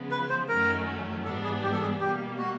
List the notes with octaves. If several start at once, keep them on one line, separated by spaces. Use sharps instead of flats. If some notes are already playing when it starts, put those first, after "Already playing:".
Already playing: C#3 F3 G#3 B3
B4
C5
F#2 D#3 F#3 A3 C#4 A#4
G#2 E3 G3 B3 D4 A4
G#4
G4
A4
G#4
B2 G3 A#3 G4
F#4